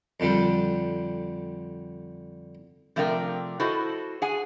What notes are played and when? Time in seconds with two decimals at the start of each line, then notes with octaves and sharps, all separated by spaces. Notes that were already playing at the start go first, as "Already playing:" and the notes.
0.20 F2 D3 G3
2.96 C3 F3 A3 D4 A#4 G5
3.60 E4 F#4 A4 C5 D#5
4.22 G#4 F#5 G#5